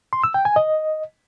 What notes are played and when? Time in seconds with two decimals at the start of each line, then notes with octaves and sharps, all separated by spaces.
0.13 C6
0.24 E6
0.34 G5
0.45 G#5
0.56 D#5